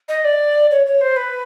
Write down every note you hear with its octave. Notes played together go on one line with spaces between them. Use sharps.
D#5
D5
C#5
C#5
C5
B4